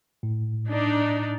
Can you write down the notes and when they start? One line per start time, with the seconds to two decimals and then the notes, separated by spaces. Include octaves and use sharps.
0.23 A2
0.69 D4 D#4